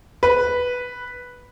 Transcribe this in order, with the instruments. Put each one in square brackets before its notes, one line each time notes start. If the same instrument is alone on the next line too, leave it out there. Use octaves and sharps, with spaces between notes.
[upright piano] B4